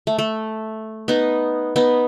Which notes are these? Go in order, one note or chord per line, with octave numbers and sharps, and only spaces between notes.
A3
A3
B3 D#4
B3 D#4